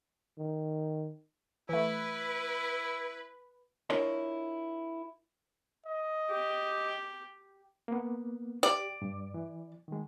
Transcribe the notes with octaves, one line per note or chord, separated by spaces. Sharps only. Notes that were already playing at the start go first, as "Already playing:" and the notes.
D#3
E3 A3 E4 B4
D4 E4 F4 A#4 C#5 D#5
D#5
G4
A#3 B3
G4 D5
G2
E3
D#3 G#3